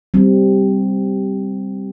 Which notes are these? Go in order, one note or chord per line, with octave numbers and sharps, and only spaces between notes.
G3 C4